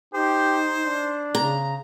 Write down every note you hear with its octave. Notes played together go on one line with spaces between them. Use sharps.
D#4 G4 C5
D4
C#3 A#5